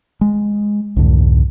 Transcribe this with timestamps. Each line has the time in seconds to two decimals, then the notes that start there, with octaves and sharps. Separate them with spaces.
0.21 G#3
0.96 C2 F2 G#2 D3